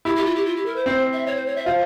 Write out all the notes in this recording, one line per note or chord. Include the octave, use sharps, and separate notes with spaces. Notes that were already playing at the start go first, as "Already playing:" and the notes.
E4 G4
G4
F4
G4
F4
G4
A#4
C5
C4 C5
E5
C#5
C5
C#5
E5
F4 C5